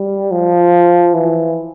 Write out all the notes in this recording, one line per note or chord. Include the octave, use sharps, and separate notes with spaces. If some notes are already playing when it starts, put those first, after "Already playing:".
Already playing: G3
F3
E3